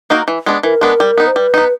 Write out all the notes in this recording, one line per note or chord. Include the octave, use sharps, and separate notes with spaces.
A#3 D#4 F#4 A#4
E3
G#3 B3 D4
E3 A#4
G#3 B3 D4
G3
B3 D#4
C5
G3 B4
B3 D#4